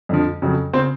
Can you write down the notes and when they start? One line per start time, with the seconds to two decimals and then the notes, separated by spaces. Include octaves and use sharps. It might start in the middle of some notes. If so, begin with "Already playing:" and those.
0.09 F2 D3 F3
0.42 F2 C#3 F#3
0.73 C#3 C4 C5